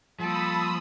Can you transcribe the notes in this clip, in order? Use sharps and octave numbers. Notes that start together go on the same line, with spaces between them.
F3 G3 A#3 A4 B5 D#6 E6